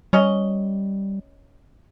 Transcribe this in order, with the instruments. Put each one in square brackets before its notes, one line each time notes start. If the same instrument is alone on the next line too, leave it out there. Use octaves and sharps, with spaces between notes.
[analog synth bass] G3 [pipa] C#4 C#5 D#5